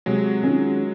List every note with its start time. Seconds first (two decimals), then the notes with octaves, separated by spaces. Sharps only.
0.06 C3 F#3 G#3
0.43 D#3 G#3 C#4 F4